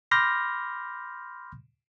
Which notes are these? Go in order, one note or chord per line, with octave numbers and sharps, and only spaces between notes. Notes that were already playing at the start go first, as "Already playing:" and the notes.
B5 C6 D6 F6 G6 A#6